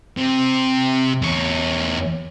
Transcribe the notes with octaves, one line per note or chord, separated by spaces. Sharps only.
C3
E2 C#5